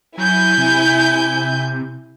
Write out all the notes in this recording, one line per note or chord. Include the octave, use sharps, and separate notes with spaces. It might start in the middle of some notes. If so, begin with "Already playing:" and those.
F#3 E4 G#5 G6
C3